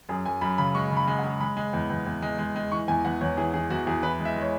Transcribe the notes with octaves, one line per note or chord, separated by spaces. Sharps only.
F#2 G#4
F#2 G#5
F#2 B5
C#3 B5
G#3 C#6
C#3
B5
G#3
F#5
G#3
G#3 B5
G#3
E2
E2
E2
G#3
G#3
G#3
E3 C#6
E2 G#5
E2 F#5
E2 C#5
E3 G#4
E3 G#4
E2 F#4
E2 G#4
E3 B4
G#3
E5
G#3
C#5